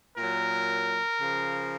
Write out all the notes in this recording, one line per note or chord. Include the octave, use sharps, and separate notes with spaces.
A#2 F#3 A#4
C#3 F3